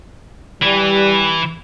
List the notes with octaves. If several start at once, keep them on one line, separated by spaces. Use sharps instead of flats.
E3 G3